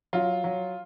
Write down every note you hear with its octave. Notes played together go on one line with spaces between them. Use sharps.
F#3 F4
F#3